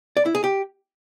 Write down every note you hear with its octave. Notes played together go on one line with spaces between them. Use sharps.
D5
E4
G#4
G4